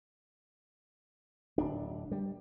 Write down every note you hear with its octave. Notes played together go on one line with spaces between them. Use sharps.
D1 D4
G3